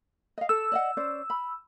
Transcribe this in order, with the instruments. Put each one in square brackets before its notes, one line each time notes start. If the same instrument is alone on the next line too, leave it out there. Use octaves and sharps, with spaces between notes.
[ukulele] D#5 F5
[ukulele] A4 [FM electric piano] E6
[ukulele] D5 D#5 F#5
C#4 C5 D5
B5